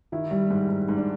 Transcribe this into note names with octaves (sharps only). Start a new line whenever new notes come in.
D#3 E4
G3
G#2
G#2
G#2
D4